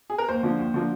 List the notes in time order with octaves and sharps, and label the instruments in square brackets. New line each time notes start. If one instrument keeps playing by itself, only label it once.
[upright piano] G#4
A#4
D#2 C5
D3 F3 A#3
D#2
D3 F3 A#3